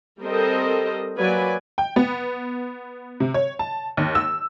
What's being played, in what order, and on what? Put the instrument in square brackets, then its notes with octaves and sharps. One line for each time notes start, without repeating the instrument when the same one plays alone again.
[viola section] G3 C4 A4 A#4 C5 D#5
F#3 A#3 B4 D5 G#5
[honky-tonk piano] G5
B3
C3
C#5
A5
D#2
E6